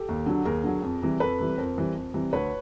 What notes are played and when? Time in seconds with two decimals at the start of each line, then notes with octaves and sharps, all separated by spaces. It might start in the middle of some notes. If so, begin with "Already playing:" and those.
Already playing: G4 A4
0.09 D#2
0.26 D3 F#3
0.45 D#2 G#4 A#4
0.64 D3 F#3
0.82 F2
1.02 C3 E3 G3
1.20 F2 A4 B4
1.39 C3 E3 G3
1.58 F2 A#4 C5
1.76 C3 E3 G3
1.94 F2
2.14 C3 E3 G3
2.33 D2 B4 C#5